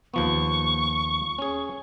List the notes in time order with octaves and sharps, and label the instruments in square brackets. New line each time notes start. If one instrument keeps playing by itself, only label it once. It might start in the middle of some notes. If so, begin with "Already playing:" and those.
[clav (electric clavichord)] D#2 F3 B3 [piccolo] C#6
[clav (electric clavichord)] C#4 G#4